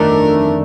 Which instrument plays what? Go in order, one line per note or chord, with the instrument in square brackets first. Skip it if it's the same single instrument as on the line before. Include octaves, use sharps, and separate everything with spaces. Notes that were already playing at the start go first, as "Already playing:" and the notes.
Already playing: [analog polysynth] G1 F2 D#3 A3 D4 [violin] A#4